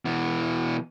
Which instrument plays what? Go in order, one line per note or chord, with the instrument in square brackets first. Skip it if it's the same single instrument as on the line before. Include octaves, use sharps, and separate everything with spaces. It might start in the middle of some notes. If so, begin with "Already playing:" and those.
[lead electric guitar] B2 E3